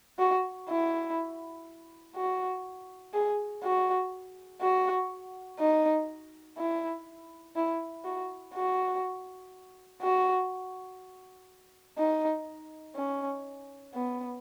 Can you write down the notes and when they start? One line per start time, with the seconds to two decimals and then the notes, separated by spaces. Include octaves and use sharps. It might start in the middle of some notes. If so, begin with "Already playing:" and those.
0.19 F#4
0.69 E4
2.16 F#4
3.14 G#4
3.64 F#4
4.62 F#4
5.60 D#4
6.58 E4
7.56 E4
8.05 F#4
8.54 F#4
10.02 F#4
11.98 D#4
12.96 C#4
13.94 B3